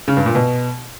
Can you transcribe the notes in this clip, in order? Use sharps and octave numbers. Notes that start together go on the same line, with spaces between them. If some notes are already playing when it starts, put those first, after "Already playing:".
C#3
G2
A#2
B2